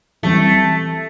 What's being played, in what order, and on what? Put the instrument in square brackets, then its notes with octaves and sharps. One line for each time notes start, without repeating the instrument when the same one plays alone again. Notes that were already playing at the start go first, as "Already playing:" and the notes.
[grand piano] E3 G3 C4 [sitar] A3